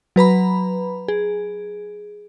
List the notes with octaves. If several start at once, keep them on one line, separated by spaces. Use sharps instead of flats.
F#3 B4 A#5 B5
G#4